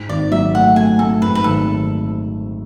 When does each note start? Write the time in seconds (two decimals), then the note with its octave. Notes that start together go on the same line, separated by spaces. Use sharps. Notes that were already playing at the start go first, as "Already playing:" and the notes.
Already playing: G#2
0.09 G#1 D5
0.31 F#3 E5
0.54 A3 F#5
0.76 A3 G#5
0.99 A3 A4
1.22 G#2 B4
1.35 B4
1.44 G#1 A4